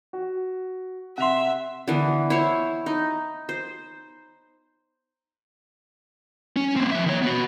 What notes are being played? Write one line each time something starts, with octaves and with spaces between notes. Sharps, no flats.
F#4
C3 E5 F#5 C6 F7
D3 E3 B3
E4 C5 C#5
D#4
C5
C#4
A#3 C4
F3 E5
D#3 C#5
B3 F#4